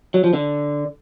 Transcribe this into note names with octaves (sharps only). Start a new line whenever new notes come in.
F#3
F3
D3